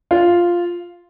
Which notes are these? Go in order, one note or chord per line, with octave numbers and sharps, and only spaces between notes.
F4